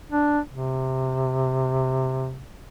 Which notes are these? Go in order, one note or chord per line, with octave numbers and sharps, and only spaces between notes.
D4
C3